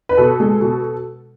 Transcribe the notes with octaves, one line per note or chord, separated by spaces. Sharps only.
B4
B2 A4
G#3
B2